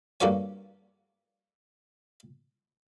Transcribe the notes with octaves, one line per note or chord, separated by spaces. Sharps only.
G2 A#3 F#4 A4 C#5 G#5